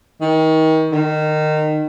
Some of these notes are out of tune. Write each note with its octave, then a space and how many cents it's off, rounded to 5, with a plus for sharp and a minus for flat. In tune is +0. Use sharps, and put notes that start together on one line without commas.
D#3 +30
D#3 -20